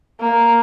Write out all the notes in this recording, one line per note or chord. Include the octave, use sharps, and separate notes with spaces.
A#3